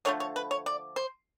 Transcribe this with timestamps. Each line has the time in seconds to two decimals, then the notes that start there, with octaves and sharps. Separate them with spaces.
0.05 D3 F3 A3 C#5
0.20 C#5
0.36 B4
0.51 C#5
0.66 D5
0.96 C5